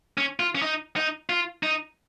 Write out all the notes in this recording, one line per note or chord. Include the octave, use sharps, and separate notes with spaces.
C#4
F4
C#4
D#4
D#4
F4
D#4